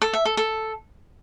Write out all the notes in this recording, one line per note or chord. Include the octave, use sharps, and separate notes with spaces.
A4
E5
A4
A4